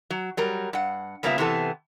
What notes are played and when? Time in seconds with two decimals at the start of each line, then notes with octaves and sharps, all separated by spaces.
0.10 F#3
0.37 F#3 G3 A#4
0.73 G2 F#5
1.23 C#3 G3 A#3 B3 F4 E5
1.38 C3 E3 B3 A4